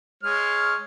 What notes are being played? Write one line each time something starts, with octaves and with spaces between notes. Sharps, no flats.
G#3 C#5 F6